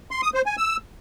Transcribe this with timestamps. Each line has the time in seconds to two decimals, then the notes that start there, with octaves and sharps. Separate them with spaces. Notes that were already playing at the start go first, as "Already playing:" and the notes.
0.11 C6
0.23 D#6
0.34 C5
0.46 G#5
0.58 E6